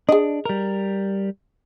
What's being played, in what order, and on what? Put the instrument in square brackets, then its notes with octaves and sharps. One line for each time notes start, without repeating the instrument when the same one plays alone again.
[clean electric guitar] D4 [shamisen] G#4 D#5
[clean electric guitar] G3 A#4